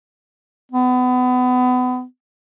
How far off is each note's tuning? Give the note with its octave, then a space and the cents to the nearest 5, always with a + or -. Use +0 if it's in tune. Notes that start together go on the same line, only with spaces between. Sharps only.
B3 +30